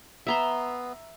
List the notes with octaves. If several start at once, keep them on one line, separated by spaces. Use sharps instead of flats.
B3 E5 A#5 C6